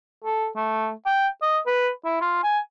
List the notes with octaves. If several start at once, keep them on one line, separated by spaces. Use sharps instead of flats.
A4
A3
G5
D#5
B4
E4
F4
G#5